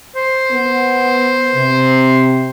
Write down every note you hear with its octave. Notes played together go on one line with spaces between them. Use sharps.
C5
B3
C3